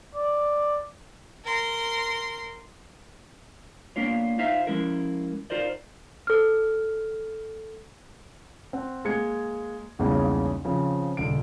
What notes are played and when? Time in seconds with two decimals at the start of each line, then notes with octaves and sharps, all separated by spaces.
0.15 D5
1.44 A#4 C6
3.96 A#3 B3 D4 F4 C#5
4.39 D#4 F4 C5 E5 F5
4.67 F3 G#3 C#4 E4 A#4
5.50 D#4 F4 A#4 C5 D5
6.27 A4 F6
8.73 C4 F#5
9.05 G#3 A#3 G#6 C#7
9.99 B1 E2 G2 C#3 G#3 A#3
10.65 C#3 F3 C4
11.17 D#1 C#2 D3 D7